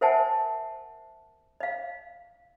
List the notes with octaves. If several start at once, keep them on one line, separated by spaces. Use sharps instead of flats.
A#4 C5 E5 F#5 G#5 A5
D#5 F5